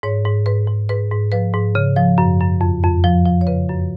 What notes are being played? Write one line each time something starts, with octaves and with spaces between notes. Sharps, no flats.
G#2 C#5
G#2
G#2 B4
G#2
G#2 B4
G#2
F3 B4
G#2
C#3
F3
F#2
F#2
F2
F2
F3
F3
C#5
C#3 B4
F#2